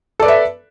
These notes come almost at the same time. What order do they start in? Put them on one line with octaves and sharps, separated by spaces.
A4 D5 B4 E5